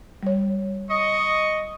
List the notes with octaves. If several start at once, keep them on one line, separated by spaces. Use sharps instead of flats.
G3 C#5
D#5 C#6